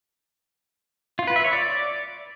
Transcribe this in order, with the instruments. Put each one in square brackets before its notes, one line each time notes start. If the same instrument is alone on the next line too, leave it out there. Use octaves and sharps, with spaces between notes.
[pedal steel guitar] F4
B4
E5
C#5
D5